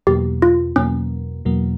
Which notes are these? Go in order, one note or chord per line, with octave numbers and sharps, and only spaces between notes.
E2 B2 F#3 A#3 G4
F4
E2 B2 F#3 A#3 C#4
E2 B2 F#3 A#3